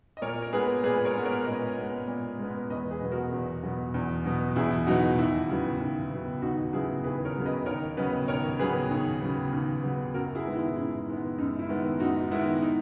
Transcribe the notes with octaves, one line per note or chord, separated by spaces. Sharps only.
D#5
A#2 A#4 C#5
A#4
G#3 B3 G#4 B4
A#2 G#4 B4
A#4 C#5
G#3 B3
A#4 C#5
A#2 B4 D#5
G#3 B3
A#2
G#3 B3
E2 B4 D#5
G#4 B4
B2 F#3 B3
F#4 A#4
E2
B2 F#3 B3
E2
B2 F#3 B3
E2 E4 G#4
B2 F#3 B3 D#4 F#4
D#2 E4
C#3 F#3 B3
D#2
C#3 F#3 B3
D#2 D#4 F#4
C#3 F#3 B3 E4 G#4
D#2 G#4 B4
A#4 C#5
C#3 F#3 B3
B4 D#5
D#2 A#4 C#5
C#3 F#3 B3 B4 D#5
D#2 A#4 C#5
C#3 F#3 B3 G#4 B4
D#2
C#3 F#3 B3
D#2
C#3 F#3 B3
F#2 F#4 A#4
E4 G#4
D#3 G#3 B3
E4
F#2 E4
D#3 G#3 B3
F#2 D#4
E4
D#3 G#3 B3
F#2 D#4 F#4
D#3 G#3 B3 E4
D#4